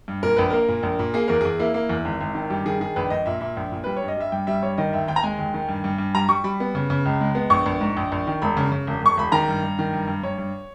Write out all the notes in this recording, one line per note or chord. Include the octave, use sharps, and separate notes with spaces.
G2
A#2 A#4
A#1 B4
A#3 A#4
A#2
A#1
A#2
A#3 G#4
E2 A#4
E2 G#4
A#3 E4
A#3
E2
G#1
G#1
D#3
G2 G4
D#3 G#4
D#3 G#4
A#1 B4
A#1 D#5
A#2 E5
A#2 E5
A#1
A#2
G3 B4
C#5
G2
D#5
G3 E5
G2 G5
G3 E5
G2 C#5
D#3 D#5
D#2 E5
D#2 G5
A#5
G#3 G#5
D#2
D#3
G2
G2
G2
G3 A#5
G3 C#6
G3 B5
B3
C#3
C#3
C#2
G#3
B3
A#1 C#6
A#1
G#2
A#1
A#1
D#3
E1 B5
C#3
C#3
E1
E1 C#6
E1 B5
D#3 A#5
G2
G2
D#3
G2
G2
G2 C#5
G2